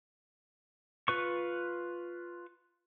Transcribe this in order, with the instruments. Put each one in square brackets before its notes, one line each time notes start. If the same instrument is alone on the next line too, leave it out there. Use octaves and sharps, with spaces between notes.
[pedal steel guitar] F4 B4 C#6